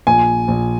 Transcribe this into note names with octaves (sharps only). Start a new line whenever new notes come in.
A#1 G#5
A#1